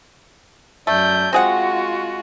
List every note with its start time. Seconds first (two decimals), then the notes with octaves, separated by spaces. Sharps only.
0.87 F#2 A3 D5 G6
1.33 G#3 C4 F4 F#4 G#4 F#5